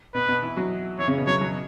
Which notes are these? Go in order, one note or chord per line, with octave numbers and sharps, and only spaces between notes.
B2 B3 B4
B2 B3
E3 E4
F#3 F#4
E3 E4 C#5
C#3 C#4
B2 B3
F#3 C#5
F#3